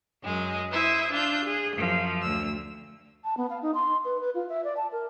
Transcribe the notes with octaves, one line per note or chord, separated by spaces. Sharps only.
F#2 G#3 D#5
E4 C5 E5 D#6
D4 F4 E6 G6
G#4
F#2 F3
D2 E6
A5
B3
F5
D#4
C6
B4
B4
F4
E5
D5
A5
A#4